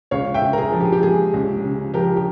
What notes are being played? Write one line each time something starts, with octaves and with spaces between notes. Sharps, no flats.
C#2 C#5 F5
E5 G5
C#3
A#4
G#4
F3
G4
G4
G#3 G#4
C#2
C#3
F3 G4 A#4
G4